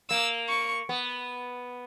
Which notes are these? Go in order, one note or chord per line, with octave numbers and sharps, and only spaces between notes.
A#3 E6
C#6
B3